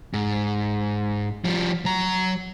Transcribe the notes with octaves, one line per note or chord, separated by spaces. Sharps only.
G#2
F3 G3
F#3 A#5